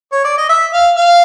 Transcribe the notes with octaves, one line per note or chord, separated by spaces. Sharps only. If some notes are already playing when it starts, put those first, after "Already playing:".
C#5
D5
D#5
E5
F5
F5